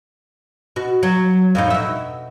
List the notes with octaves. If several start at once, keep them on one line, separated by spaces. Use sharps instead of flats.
B2 F#4
F#3
F2 A2 D#4
B2 E5